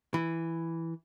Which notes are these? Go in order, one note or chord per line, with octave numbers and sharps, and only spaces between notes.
E3